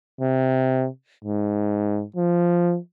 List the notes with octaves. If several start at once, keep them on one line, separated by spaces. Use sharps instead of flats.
C3
G#2
F3